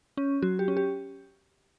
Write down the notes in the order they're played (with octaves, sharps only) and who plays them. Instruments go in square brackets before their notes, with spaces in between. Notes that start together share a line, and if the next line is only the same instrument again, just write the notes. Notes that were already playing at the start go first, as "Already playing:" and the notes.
[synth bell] C#4
F#3 F#4
G4
C#4
G4